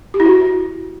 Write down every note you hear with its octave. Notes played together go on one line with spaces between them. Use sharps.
G4
E4
F#4